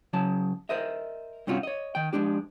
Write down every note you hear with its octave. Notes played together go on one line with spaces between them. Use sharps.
C#3 F#3 A5
A#4 C5 D#5 E5
G2 C3 C#4 F4 F#4
C#5 D#5
D#3 G5
F3 F#3 G#3 D4 G4